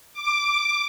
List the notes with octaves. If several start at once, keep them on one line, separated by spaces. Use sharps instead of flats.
D6